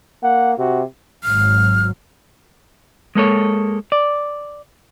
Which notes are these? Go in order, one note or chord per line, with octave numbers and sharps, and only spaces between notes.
A#3 F#5
C3 F#4
G#1 G#2 F#3 F6
G#3 A#3 A4 C#5
D5